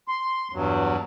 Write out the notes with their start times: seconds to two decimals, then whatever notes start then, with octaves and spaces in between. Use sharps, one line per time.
0.08 C6
0.53 E2 G2 F#3